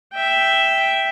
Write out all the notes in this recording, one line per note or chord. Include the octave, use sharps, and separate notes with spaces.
E5 G5